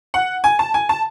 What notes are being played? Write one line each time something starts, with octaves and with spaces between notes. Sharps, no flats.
F#5
G#5
A5
G#5
A5